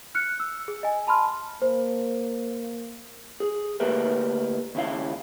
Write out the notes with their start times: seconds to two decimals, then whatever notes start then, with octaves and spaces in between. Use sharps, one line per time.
0.15 F6 F#6 C#7
0.40 E6
0.68 G#4
0.83 D#5 G#5
1.07 A5 B5 C6 F6
1.62 A#3 C5
3.40 G#4
3.80 D2 A#3 G4 A#4 B4 E5
4.75 D#2 C#3 E4 F5